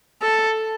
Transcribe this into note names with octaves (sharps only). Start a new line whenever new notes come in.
A4